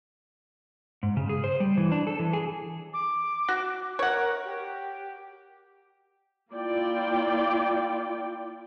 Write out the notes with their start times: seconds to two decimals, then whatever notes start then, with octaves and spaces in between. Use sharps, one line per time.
1.03 G#2
1.17 C#3
1.29 G#4
1.44 C5
1.60 G3
1.77 E3
1.92 D4
2.07 A4
2.19 E3
2.33 G#4
2.93 D6
3.48 F#4
3.99 A#4 C#5 F#5
4.45 G4
6.52 A#3 E4 F4 D5 G5